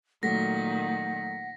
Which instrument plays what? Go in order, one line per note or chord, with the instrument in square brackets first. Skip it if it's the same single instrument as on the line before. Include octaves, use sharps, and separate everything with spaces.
[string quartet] A#2 D#3 [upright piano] F#3 A3 [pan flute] F#5 [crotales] A#6 B6